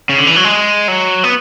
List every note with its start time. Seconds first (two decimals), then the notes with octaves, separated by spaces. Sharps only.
0.09 C#3
0.19 D3
0.27 E3
0.36 F#3
0.44 G#3
0.88 F#3
1.24 B3